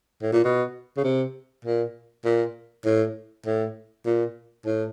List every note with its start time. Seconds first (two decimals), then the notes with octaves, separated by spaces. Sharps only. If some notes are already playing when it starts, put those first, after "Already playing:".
0.22 A2
0.32 A#2
0.44 B2
0.97 C#3
1.04 C3
1.65 A#2
2.25 A#2
2.85 A2
3.46 A2
4.06 A#2
4.66 A2